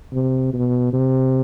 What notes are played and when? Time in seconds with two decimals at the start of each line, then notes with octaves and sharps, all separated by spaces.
0.13 C3
0.53 B2
0.93 C3